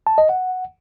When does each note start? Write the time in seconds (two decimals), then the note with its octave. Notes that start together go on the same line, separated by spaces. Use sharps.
0.07 A5
0.18 D#5
0.29 F#5